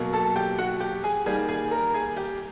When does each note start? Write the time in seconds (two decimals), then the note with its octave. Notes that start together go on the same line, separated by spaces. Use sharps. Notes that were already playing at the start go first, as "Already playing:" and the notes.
Already playing: B2 F#3 A#3
0.13 A4 A5
0.36 G4 G5
0.58 F#4 F#5
0.80 G4 G5
1.04 G#4 G#5
1.26 D#3 G3 A#3 G#4 G#5
1.48 G#4 G#5
1.71 A#4 A#5
1.94 G#4 G#5
2.17 G4 G5